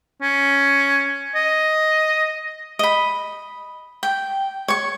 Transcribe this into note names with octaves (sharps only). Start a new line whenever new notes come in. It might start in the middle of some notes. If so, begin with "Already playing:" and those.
C#4
D#5
D#5 B5
G5
C#5 C#6